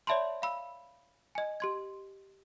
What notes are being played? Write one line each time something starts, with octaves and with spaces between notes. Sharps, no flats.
C#5 D5 E5 A5 B5 C6
F5 B5 E6
D#5 G#5
G4 C6 G#6